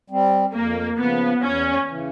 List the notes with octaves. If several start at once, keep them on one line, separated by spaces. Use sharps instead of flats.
G3 C4
F2 A#3
C#3 F3 B3
E2 C#4
C#3 E3